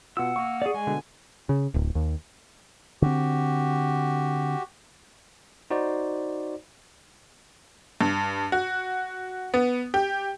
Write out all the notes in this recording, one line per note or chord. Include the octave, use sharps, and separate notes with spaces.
B2 F4 F#5 E6
A#3 C#6
G#4 D5
G#3 G#5
B2 D3
C#3
D1
D#2
D3 C4 F#4 G4
D#4 F#4 C5 D5
G2
F#4
B3
G4